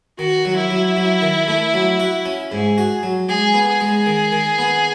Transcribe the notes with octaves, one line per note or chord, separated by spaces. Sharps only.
D#3 F#4
F#3
E4
F#3
F#3
D#3
A3
F#3
F#4
C#4
G#2 G#4
F#4
F#3
G#3 G#4
B3
G#4
G#3
D#3
D#3
B3